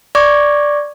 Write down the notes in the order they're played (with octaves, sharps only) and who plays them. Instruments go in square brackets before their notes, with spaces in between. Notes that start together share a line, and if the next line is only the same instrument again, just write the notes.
[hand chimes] D5 C#6 D6 G#6 A#6